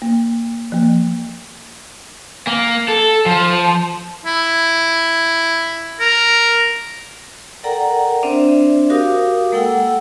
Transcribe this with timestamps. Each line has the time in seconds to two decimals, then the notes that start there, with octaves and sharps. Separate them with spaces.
0.02 A#3
0.72 F3 A#3
2.47 A#3
2.88 A4
3.26 F3
4.26 E4
6.00 A#4
7.63 A4 A#4 D5 F#5 G5 A#5
8.23 C4 D4 C5 D5 E5
8.90 F#4 G4 A#4 F5 D6 D#6
9.52 G#3 A#3 A4 F#5 G5 E6